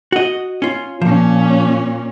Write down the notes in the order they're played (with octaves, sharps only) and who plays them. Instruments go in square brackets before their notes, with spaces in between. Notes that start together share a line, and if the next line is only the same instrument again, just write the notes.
[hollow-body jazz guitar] F#4 D#5
C#4 F4
[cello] A#2 C#4 [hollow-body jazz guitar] F3